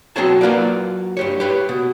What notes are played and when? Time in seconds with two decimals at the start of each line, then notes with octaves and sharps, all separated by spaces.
0.16 B2 F#3 C4 G#4 C#5 A5
0.41 F#3 A#3 F4 B4 D5
1.17 G2 G4 C#5
1.40 G4 B4 C#5
1.69 B2